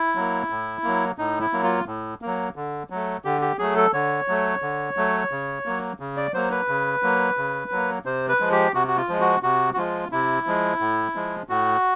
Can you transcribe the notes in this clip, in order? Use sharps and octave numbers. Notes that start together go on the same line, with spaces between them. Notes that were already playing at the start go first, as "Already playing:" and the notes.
Already playing: E4
F#3 A#3
A2
F#3 A#3
A2 D#4
E4
F#3 A#3
F4
A2
F#3 A#3
D3
F#3 A3
D3 G4
G4
F#3 A3 G#4
A4
D3 C#5
F#3 A3
D3
F#3 A3
C#3
F#3 A#3
C#3
D5
F#3 A#3 C5
B4
C#3
F#3 A#3
C#3
F#3 A#3
C3 C5
B4
F3 G#3
G4
C3 F#4
F#4
F4
F3 G#3
F#4
C3 F#4
F#4
F3 G#3 F4
C3 E4
F3 G#3
A2
F3 G#3
A2 F#4